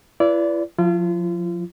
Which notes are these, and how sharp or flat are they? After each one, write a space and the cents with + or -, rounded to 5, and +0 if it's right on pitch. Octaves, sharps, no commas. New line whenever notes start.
E4 +40 B4 +0 D5 -20
F3 +30 F4 -35